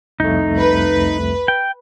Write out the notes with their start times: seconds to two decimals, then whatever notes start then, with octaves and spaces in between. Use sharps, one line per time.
0.20 C2 F2 A3 D#4
0.58 B4
1.48 G5